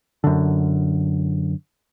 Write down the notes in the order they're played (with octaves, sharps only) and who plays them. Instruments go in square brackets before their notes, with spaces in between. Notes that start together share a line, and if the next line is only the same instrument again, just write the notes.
[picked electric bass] F#2 D3